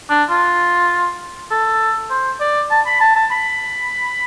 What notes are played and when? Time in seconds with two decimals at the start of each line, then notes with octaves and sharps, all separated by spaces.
0.10 D4
0.29 F4
1.51 A4
2.10 C5
2.41 D5
2.70 A5
2.86 B5
3.01 A5
3.16 A5
3.32 B5